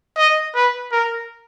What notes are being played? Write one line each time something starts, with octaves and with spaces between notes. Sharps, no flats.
D#5
B4
A#4